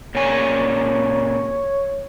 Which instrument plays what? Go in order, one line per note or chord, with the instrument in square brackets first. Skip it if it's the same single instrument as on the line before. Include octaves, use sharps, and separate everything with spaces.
[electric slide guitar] A#2 C#3 G#5 [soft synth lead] C#5